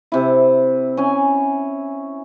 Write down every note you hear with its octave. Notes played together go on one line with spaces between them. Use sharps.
C3 E4
C#4 G#5